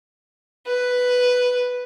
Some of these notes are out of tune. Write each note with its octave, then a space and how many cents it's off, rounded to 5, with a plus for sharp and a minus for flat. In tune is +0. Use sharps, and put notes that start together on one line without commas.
B4 +0